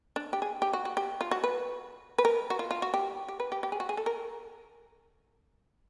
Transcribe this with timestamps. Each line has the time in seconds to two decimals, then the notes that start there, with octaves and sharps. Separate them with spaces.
0.16 D4
0.33 G4
0.42 G#4
0.62 G4
0.73 F#4
0.85 F#4
0.97 G4
1.21 F4
1.31 F#4
1.44 B4
2.18 B4
2.25 A#4
2.50 F#4
2.59 F4
2.71 F4
2.82 F#4
2.94 G4
3.28 G4
3.40 B4
3.52 G4
3.63 G4
3.72 G#4
3.80 F#4
3.89 G#4
3.97 A4
4.06 A#4